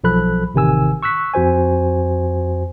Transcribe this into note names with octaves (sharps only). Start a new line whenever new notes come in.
B1 F3 A4 B5 F#6
A1 C3 D#3 G#5 E6
C#6 E6 F#6 B6
F2 F#4 C5 G#5